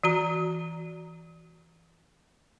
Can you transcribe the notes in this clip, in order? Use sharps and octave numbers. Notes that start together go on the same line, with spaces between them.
E3 F#4 A#5